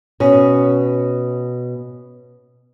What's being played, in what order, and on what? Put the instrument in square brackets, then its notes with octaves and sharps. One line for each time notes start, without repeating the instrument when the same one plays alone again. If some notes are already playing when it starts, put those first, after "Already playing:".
[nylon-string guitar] B2 C#4